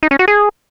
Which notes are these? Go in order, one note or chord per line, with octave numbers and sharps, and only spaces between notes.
D#4
C#4
F#4
G#4